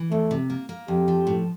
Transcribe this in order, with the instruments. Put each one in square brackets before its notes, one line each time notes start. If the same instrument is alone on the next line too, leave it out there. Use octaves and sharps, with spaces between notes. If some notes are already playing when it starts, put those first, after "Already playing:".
Already playing: [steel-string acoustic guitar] E3
[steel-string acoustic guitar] E2 [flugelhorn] A3
[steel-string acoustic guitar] C3
A#3
A#3
[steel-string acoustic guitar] F2 [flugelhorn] G4
[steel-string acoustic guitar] F3
A2